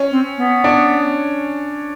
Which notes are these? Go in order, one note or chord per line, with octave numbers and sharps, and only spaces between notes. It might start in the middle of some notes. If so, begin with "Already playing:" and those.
Already playing: C#4
C4
B3
D4